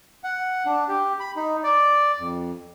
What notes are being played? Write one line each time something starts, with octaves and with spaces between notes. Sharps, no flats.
F#5
D4
G4
B5
D#4
D5
F2